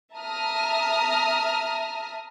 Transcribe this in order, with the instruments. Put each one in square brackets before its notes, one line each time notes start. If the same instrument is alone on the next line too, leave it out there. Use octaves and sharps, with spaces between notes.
[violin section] E5 A5 A#5 D#6 F6